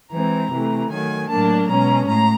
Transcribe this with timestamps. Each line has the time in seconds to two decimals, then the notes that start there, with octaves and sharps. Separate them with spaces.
0.12 E3 G#3 C4 A#5
0.51 C3 E3 A3
0.90 D#3 F#3 A3 G#5
1.29 A2 F#3 A#3 D4 A5
1.68 B2 G#3 C#4 A#5
2.07 A2 A#5